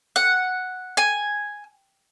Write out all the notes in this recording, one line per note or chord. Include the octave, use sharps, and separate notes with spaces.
F#5
G#5